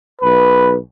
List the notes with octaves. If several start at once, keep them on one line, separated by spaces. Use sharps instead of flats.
B1 B4